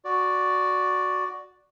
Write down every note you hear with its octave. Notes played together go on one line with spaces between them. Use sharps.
F#4 D5